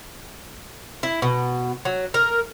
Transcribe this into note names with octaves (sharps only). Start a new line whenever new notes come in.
E4
B2
F#3
A#4